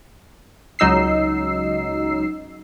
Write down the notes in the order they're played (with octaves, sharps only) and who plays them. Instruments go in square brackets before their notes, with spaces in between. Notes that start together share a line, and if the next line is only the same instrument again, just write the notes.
[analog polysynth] C#2 F#3 D#4 E6 C7